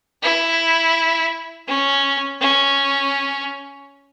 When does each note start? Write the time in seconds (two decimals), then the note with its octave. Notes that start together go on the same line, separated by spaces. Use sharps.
0.23 E4
1.67 C#4
2.41 C#4